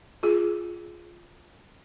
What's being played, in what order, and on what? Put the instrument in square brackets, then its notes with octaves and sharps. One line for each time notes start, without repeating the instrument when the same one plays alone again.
[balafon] F4 G#4